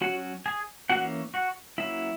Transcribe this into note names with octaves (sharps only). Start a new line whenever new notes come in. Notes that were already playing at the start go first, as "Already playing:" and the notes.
F#3 C#4 F#4 F#5
G#4 G#5
E3 A#3 C#4 F#4 F#5
F#4 F#5
F#3 A#3 C#4 E4 E5